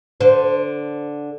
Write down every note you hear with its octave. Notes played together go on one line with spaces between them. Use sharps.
D3 C5